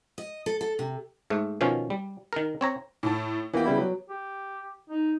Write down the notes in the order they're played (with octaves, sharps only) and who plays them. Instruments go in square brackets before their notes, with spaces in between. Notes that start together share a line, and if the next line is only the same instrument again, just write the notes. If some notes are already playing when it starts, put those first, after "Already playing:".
[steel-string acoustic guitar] D#5
A4
A4
C3
[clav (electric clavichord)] G#2 A3
B2 D#3 F3 C#4 F5
G3
D#3 A#4
C4 C#5 A#5
[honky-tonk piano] A2 A4
[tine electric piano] E3 A#3 [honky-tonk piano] B3 G4
[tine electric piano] C#3 G3 E4
F#3
[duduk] G4
D#4